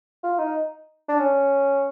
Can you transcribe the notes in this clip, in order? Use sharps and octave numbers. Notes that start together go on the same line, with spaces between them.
F4
D#4
D4
C#4